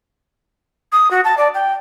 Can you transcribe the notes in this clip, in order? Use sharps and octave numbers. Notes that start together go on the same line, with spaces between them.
D#6
F#4
A5
D5
G5